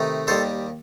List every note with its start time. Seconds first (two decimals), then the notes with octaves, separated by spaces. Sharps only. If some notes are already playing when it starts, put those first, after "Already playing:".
Already playing: C3 D#3 A3 D#4
0.27 D#2 D#3 G3 A4 C5